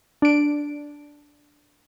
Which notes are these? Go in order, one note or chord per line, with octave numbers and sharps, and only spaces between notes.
D4 D7